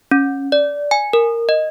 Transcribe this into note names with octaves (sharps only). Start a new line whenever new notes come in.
C#4
D5
G#5
A#4
D#5